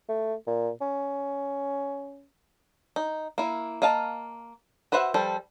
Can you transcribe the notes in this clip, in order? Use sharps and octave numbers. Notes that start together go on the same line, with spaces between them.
A3
A#2
C#4
D#4
A#3 E4
A#3 D#5 F5 A5
F#4 B4 C5 E5 F#5
F3 G3 A4